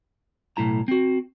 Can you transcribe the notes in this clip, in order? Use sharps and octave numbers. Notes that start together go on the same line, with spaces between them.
B1 A2 E4 A#5
C4 F#4